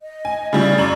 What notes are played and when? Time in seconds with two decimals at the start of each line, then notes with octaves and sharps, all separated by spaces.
0.02 D#5
0.25 G#5
0.53 C#3 G3 E4 D5
0.78 F#2 F#7